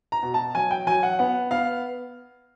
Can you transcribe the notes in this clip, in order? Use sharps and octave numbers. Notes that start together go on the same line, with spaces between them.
A#5
B2
A5
F#3 G#5
G5
F#3 G#5
F#5
B3 F#5
B3 F5